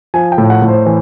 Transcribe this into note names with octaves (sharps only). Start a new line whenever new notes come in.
F3 G#5
G5
A2
F#5
A2
C5
E3